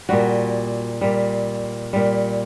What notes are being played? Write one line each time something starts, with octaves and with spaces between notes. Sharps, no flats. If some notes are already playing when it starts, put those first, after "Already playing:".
A#2 G3 F#4
A#2 G3
A#2 G3